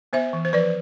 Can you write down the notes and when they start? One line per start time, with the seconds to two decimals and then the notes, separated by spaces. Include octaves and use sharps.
0.13 B3 C5 E5
0.33 E3
0.45 C5
0.53 F3 B4 D5